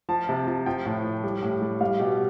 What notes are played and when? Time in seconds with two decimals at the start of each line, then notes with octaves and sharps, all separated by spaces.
0.09 F3 A5
0.29 C3
0.47 F3
0.66 F3 G5
0.86 A2
1.04 F3
1.24 G3
1.43 A2
1.62 G3
1.81 G3 F5
2.00 B2 G4